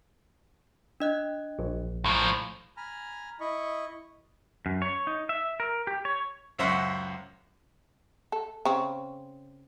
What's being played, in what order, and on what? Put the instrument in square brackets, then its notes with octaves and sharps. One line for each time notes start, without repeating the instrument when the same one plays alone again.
[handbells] D4 D#5 F#6
[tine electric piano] A#1
[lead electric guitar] A2 F3 [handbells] F5
[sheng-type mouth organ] G#5 A#5 B5 F6
E4 D#5 B5 C#6
[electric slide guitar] F#2
C#5
D#4
E5
A#4
G4
C#5
[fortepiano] C#2 F#2 C5 E5 F#5
[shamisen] A4
C#3 C4